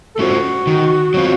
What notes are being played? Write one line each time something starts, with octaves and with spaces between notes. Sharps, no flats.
A4
A3 C#4 F4 F#4 C5
D#3
F#3 C4 F4